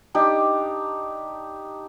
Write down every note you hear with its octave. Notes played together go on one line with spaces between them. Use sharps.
D4 D#4 G4